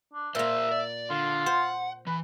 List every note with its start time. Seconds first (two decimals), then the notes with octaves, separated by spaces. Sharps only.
0.13 D4
0.35 A#2 A#3 A#4 C5 E5
0.71 D5
1.10 D3 F4
1.46 C5 F#5
2.07 E3 B4